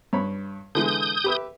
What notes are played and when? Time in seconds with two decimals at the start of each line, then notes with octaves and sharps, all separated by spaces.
0.13 G2 C#5 B5
0.75 D3 E3 G#3 D#6 G6
1.24 G4 B4 E5